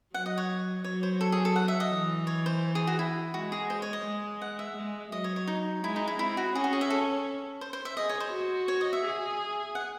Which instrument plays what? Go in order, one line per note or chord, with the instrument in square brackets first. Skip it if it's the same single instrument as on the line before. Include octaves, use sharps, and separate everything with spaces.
[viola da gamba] F#3 [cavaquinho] F#5
[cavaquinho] D#5
C#5
[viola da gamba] F#3 [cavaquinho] C#5
[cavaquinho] C5
A4
G#4
A4
F#5
E5
D#5
[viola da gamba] E3
[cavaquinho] C#5
C5
G#4
F#4
E4
[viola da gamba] G#3 [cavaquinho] F#4
[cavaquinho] G#4
C5
C#5
D#5
[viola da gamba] G#3
[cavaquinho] F#5
E5
[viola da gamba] G#3
[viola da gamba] F#3 [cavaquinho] D#5
[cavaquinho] C#5
C#5
D#4
[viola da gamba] G#3 [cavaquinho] E4
[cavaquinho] D#4
E4
[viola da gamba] C4 [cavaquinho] E4
[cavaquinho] F#4
[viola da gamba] C#4 [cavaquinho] G#4
[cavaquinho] F#4
G#4
E5
A4
C5
C5
E5
[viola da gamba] G#4 [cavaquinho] D#5
[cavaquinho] C#5
C5
[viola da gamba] F#4
[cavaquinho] C#5
D#5
E5
[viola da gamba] G#4
[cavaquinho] F#5